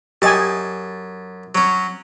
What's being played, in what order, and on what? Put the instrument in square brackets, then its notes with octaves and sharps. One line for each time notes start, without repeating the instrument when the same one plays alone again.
[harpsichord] F#2 A5 [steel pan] G4 D#5 G#5
[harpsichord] F#3 C#4